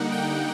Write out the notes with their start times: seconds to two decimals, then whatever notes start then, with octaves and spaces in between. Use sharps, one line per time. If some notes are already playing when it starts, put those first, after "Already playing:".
Already playing: D3 G3 A#3 D#4 F#5
0.12 G5